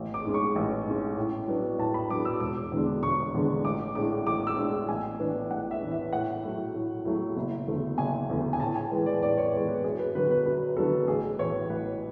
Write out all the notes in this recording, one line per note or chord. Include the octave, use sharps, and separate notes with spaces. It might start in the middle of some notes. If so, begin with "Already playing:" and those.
Already playing: A1
D6
G#2 G#3 C#4
C#6
A1
G#2 G#3 C#4
A2
F#3 B3 D4
A2 A5
B5
F#3 B3 D4 D6
E6
E1 D6
E2 D3 G#3 D4
E1 C#6
E2 D3 G#3 D4
A1 D6
A2 G#3 D4 D6
A1 D6
E6
A2 G#3 D4
A1 G#5
A2 E3 B3 D4
A1 F#5
E5
A2 E3 B3 D4
E5
A2 F#5
F#3 A3 E4
A2
F#3 A3 E4
F#1
E2 D3 A3
F#1 G#5
E2 D3 A3
G#5
A2 A5
G#5
E3 G#3 B3
D5
A2 D5
C#5
E3 G#3 B3 C#5
B4
F#2 G#4
B4
D3 F#3 B3 B4
B4
F#2 B4
D3 F#3 B3 A4
A1 G#4
A2 E3 C#5
A1 B4